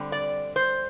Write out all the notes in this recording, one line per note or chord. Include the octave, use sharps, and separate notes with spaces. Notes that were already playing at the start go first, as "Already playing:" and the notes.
Already playing: D3 G3 C4
D5
C5